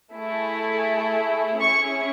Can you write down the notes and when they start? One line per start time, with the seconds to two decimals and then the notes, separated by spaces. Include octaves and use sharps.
0.14 A3 E4 G#4
1.60 C#4 E4 G#4 C#6